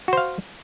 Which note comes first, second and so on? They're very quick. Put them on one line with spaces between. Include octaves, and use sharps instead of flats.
F#4 C5 F5